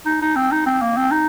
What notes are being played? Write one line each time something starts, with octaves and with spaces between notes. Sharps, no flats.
D#4
D#4
C4
D#4
C4
A#3
C4
D#4